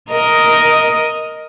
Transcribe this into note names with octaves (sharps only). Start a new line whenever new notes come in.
A#4 D#5